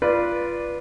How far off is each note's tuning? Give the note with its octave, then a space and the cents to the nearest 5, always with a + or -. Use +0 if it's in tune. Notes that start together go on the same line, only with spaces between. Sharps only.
F4 -20 B4 -15 D5 +0